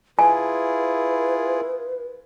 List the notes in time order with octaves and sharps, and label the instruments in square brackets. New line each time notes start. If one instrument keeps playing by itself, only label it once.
[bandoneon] E4 F4 G#4 [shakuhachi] B4 [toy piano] G#5